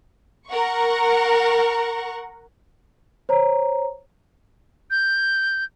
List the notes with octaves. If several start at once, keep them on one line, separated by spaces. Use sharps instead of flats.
A#4 F#5 C#6
C5 C#5 A#5
G6